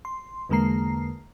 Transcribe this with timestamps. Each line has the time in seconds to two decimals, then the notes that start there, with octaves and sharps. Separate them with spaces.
0.05 C6
0.49 E2 D3 G#3 A#3 A#5 C7